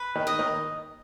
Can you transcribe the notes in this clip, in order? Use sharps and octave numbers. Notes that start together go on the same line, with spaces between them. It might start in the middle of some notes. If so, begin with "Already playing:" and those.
Already playing: B4
D#3 D#4
D#5
D#3 D#4